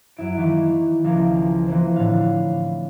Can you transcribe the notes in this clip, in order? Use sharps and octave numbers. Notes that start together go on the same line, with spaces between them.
F#2 E4 D7
D#3 E3 A#3 E4
C#2 E3 F3 A#3
E3 A#3 C4
A2 D3 F5